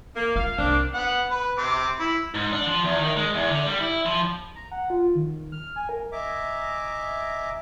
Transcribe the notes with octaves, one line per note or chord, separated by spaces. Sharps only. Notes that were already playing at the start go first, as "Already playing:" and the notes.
A#3
F4 F5
C2 A#3 C4 D4
B3 F#5
B4
C4 D6
E4
G#2
D4
F3
E2
D#3
G#3
E2
D3
G3
E4
F3
A#5
F#5
F4
D#3
F6
G#5
A#4
D#5 E5 G#5 A#5 D6